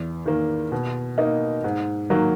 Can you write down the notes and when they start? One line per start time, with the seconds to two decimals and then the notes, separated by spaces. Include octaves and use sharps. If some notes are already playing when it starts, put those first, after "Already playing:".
Already playing: E2
0.26 D#3 A#3
0.72 B2
1.18 A#3 D#4
1.64 G#2
2.10 D#3 F#3 A#3